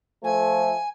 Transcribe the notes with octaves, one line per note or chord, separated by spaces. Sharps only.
F3 A3 G#5